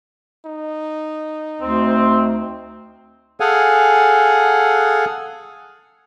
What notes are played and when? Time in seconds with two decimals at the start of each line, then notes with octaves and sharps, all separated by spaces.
0.45 D#4
1.61 D2 C4
3.40 G#4 A4 F5 F#5 G#5